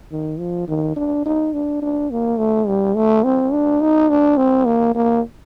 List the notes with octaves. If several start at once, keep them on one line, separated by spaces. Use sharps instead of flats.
D#3
F3
D#3
D4
D#4
D4
D4
A#3
A3
G3
A3
C4
D4
D#4
D4
C4
A#3
A#3